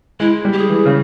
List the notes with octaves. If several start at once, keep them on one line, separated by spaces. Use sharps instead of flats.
G#3 E4
G3
G4
G#4
E3
C#3